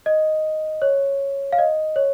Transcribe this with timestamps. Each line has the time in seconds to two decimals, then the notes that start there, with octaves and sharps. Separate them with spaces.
0.06 D#5
0.82 C#5
1.52 F5
1.59 D#5
1.96 C#5